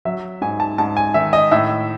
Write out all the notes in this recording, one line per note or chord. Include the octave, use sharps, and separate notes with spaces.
F#3 E5
G#2 G#5
A5
G#2 A5
G#5
D#3 E5
D#5
A2 E5